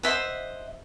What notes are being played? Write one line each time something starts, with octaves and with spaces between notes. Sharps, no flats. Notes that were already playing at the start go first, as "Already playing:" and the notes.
C5 D#5 E5 F#5